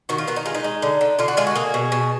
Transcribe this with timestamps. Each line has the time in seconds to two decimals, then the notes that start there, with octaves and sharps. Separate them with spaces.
0.09 D#3 F#4
0.18 F4
0.27 D#3 B3
0.36 D#4
0.46 G#3 F4
0.54 D#4
0.64 G#3
0.82 D3
1.01 D3
1.19 D3 F4
1.28 F#4
1.37 G#3 F4
1.47 F#4
1.56 A#3 G#4
1.74 B2
1.92 B2